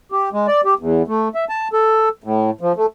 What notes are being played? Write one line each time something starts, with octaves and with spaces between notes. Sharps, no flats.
G4
G#3
D5
G4
E2
A3
E5
A5
A4
A2
F3
A3